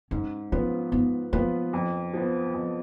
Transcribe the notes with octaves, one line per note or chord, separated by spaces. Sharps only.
G#2 C#4
F3 B3 C#4 F4 B4
G#2 B3
F3 A#3 B3 F4 B4
F2
F3 B3
F2